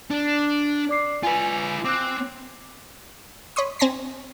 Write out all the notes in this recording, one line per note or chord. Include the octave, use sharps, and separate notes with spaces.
D4
D5 D6 C7
F4 B4 G#5
C4 D6 F#6
C#5 B5 C6 D#6
C4 G#5 C6 A#6 B6